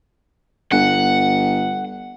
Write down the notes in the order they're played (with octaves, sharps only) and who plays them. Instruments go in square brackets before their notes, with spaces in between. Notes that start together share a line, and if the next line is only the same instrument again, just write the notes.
[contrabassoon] G1 [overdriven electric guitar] F#5